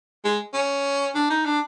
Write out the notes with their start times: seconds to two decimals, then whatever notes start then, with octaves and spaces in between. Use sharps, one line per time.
0.25 G#3
0.54 C#4
1.15 D4
1.30 D#4
1.46 D4